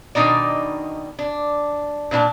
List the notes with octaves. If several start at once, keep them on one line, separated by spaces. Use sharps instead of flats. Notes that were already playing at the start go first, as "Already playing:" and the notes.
B2 D#3 F3 D4 D#4 D5
D4
A#2 D4 E4 A5